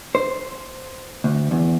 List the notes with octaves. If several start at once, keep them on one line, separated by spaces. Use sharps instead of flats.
C5
D2
E2